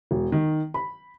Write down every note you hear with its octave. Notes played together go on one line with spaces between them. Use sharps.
E1
D#3
B5